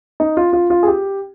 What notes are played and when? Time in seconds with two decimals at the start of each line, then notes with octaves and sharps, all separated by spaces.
0.20 D#4
0.37 F4
0.53 F4
0.70 F4
0.83 G#4
0.87 G4